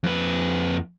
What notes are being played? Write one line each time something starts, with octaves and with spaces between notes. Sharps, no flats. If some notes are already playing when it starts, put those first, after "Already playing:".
F2 B4